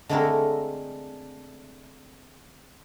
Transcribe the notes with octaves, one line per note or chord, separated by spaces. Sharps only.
D3 G#3 A3 C4 E4 A#4